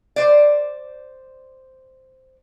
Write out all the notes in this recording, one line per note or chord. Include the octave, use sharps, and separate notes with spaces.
C5 D5